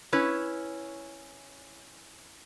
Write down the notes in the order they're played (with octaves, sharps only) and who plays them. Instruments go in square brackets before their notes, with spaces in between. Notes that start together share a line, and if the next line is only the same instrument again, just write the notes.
[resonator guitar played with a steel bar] C#4 E4 B4 C#5